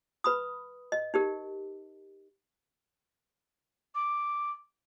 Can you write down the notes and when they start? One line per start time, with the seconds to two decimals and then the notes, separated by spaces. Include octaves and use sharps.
0.24 B4 B5 D#6
0.92 D#5
1.14 D#4 G4 A#4
3.95 D6